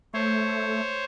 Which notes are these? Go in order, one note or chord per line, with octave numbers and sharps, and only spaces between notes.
A3 C5 C#5